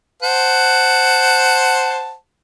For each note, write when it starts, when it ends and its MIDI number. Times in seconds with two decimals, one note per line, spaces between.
0.22 2.14 72
0.22 2.14 78
0.22 2.14 81